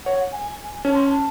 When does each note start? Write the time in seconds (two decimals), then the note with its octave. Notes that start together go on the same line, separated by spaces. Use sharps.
0.05 C#5 F#5
0.19 F#5
0.32 G#5
0.84 C#4 A5
0.94 C6
1.05 A5